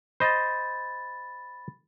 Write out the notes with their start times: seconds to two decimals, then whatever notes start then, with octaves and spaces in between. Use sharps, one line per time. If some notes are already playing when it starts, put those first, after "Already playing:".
0.20 C5 D#5 B5 A6